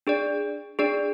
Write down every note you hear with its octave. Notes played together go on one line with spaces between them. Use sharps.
D4 G#4 D5
D4 G#4 D5